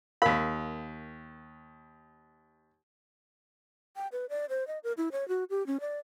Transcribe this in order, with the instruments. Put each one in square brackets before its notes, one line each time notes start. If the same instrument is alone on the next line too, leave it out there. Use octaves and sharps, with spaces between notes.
[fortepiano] D#2 B5 [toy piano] A#4 F5
[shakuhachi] G5
B4
D5
C5
D#5
A#4
E4
C#5
F#4
G4
C#4
D5